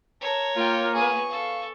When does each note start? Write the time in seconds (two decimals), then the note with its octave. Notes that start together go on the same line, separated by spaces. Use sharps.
0.21 A#4 C#5 A5
0.55 A#3 F4 G5
0.95 B3 G#4 C#6
1.30 A4 F5